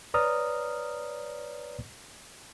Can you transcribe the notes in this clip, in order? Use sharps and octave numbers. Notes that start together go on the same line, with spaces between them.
B4 C#5 D5 A#5 D#6 F6